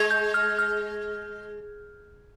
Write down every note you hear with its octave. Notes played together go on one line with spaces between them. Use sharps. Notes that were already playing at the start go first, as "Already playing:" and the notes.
Already playing: G#3 G#6
G6
F6
F6